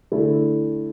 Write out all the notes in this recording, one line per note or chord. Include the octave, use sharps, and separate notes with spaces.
D3 A3 E4 A4